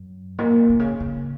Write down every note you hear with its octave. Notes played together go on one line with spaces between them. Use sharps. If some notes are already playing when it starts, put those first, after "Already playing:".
Already playing: F#2
A#2
C3
C#3
C#3